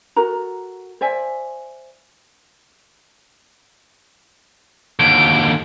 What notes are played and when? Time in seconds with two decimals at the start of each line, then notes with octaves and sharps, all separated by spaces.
0.16 F#4 A4 A#4 A#5
1.01 C5 D5 E5 G#5
4.99 D#2 D3 D7